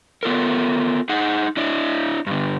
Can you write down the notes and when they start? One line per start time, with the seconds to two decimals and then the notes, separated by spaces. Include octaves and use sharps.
0.23 B3 F4 A4 A#4
1.09 D#4 G#4 F#5
1.57 D4 E4 D5
2.27 G2 D3